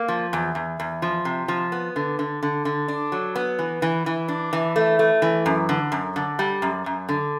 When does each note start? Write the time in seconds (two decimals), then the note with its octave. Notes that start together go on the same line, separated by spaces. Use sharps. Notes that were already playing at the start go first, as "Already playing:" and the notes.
Already playing: A#3
0.08 F3
0.33 E2
0.55 E2
0.80 E2
1.02 F3
1.25 C3
1.48 F3
1.72 B3
1.96 D3
2.19 D3
2.43 D3
2.65 D3
2.88 D4
3.12 F#3
3.35 B3
3.59 E3
3.82 E3
4.06 E3
4.28 D4
4.53 E3
4.76 A3
4.99 A3
5.22 E3
5.46 F#2
5.69 D3
5.92 F#2
6.16 D3
6.39 G3
6.62 F#2
6.86 F#2
7.09 D3